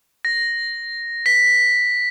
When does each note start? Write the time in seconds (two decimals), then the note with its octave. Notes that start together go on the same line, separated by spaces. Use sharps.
0.25 A#6
1.26 B6